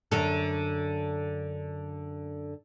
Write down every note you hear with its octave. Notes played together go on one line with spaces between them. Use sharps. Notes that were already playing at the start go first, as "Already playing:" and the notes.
F#2 D3 A4